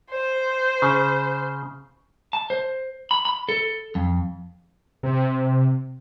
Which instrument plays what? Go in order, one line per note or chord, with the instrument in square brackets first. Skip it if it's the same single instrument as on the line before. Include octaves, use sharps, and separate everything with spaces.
[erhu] C5
[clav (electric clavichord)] C#3
[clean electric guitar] A5
C5
B5
B5
A4
F2
[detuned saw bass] C3